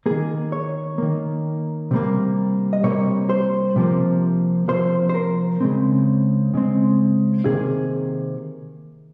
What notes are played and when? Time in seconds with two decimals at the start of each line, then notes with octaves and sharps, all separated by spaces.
0.06 D#3 A#3 G#4
0.52 C#5
0.98 D#3 A#3
1.91 C3 G3 A#3
2.73 D#5
2.83 C3 G3 A#3 C#5
3.29 C5
3.76 C3 F3 A#3
4.68 C3 F3 A#3 C5
5.09 C5
5.14 A#4
5.61 C#3 G#3 C4
6.54 C#3 G#3 C4
7.46 C3 D#3 A#3 G#4